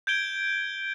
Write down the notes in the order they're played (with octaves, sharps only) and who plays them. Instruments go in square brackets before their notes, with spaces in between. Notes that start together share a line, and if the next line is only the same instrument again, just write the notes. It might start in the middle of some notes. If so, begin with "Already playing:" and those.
[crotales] G6 G#6 D7 G7